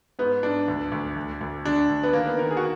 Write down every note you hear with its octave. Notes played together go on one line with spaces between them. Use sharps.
G#2 B3
G#2 D4
D2
D2
D2
D2
D3 D4
D2
B3
D#3 A#3
B3
D#3 A#4
G#4
F#4